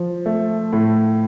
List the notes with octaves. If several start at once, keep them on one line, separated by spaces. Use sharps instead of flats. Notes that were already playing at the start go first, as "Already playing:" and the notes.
Already playing: F3
A3
A2